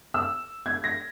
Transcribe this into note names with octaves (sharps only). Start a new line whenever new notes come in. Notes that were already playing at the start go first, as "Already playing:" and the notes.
E6
G#6
A#6